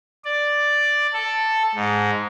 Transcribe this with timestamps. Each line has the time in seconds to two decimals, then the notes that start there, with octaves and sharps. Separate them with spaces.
0.24 D5
1.13 A4
1.75 G#2